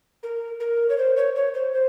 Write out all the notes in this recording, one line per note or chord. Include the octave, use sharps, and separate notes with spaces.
A#4
A#4
C#5
C5
C#5
C#5
C5
C5